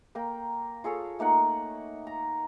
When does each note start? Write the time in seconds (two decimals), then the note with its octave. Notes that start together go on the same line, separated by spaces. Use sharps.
0.15 A#3 A#4 G5
0.84 F4 G#4 A4 C#5
1.19 A3 A#3 D#4 F#5
2.07 A#5